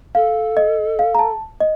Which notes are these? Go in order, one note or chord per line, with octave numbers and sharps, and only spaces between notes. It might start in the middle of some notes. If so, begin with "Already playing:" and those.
A4 F5
D#5
F5
A#5
A5
D#5